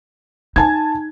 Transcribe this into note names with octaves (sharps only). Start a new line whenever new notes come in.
D#4 G#5 A5 G#6